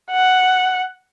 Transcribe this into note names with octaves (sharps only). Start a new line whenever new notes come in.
F#5